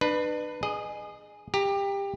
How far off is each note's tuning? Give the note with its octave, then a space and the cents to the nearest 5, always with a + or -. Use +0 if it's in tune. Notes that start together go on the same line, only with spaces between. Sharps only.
D4 +35 B4 +0
G#4 +0 D#5 -30
G4 +20 A#5 +0